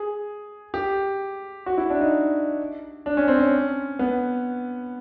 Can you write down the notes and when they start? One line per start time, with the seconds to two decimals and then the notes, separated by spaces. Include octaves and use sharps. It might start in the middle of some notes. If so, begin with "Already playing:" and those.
Already playing: G#4
0.74 G4
1.66 F#4
1.78 E4
1.90 D4
2.01 D#4
3.06 D4
3.17 C#4
3.28 C4
3.39 C#4
3.99 B3